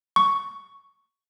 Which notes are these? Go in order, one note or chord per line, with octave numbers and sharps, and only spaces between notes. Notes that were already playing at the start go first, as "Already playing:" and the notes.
C#6